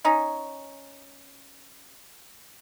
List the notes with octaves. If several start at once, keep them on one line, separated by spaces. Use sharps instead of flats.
C#4 D#4